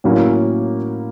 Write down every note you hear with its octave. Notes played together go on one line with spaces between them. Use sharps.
A2 F#3 A#3 C#4